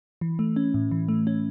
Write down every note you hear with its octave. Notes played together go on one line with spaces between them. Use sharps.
E3
A3
C#4
A2
E3
A3
C#4